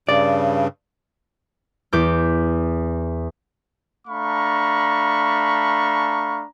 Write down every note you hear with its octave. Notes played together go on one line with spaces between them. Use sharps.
G2 C#3 D5
E2 D6 G6
A3 D4 F5 A#5 B5 C#6